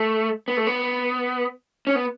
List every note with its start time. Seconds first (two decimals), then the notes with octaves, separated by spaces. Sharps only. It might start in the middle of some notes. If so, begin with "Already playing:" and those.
Already playing: A3
0.48 B3
0.57 A3
0.67 B3
1.87 C#4
1.95 B3